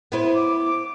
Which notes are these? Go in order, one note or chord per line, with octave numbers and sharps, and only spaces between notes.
B3 E4 C5
D6